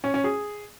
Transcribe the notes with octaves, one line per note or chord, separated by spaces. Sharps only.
C#4
C#4
G#4